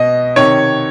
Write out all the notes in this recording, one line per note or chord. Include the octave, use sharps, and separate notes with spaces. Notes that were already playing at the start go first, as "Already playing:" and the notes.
Already playing: B2 D#5
C3 D#3 C#5